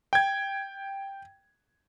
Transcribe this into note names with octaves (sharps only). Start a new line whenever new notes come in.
G5 G#6